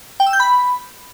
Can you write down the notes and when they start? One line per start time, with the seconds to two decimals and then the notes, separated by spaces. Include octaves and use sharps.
0.20 G5
0.26 E6
0.33 G6
0.40 B5